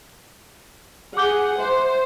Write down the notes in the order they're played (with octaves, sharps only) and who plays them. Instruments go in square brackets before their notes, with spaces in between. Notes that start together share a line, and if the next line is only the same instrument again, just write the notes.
[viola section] G#4 F#5 [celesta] D6 G6 G7
[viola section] C5 [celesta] E5